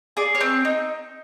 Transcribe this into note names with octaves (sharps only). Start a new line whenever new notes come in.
G#4 D5 D6
C#5 C#6
C4
D#4